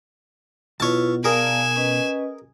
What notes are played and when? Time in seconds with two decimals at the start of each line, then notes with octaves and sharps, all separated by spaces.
0.80 B1 B2 E4 F4 B4 C#5 A5
1.24 G#4 A#4 D5 F5 G#5 A5 E7
1.77 C#4 B4 D#5